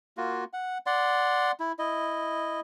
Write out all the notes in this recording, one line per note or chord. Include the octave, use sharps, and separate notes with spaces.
A#3 F4 F#4
F#5
D5 F#5 C6
E4
E4 D#5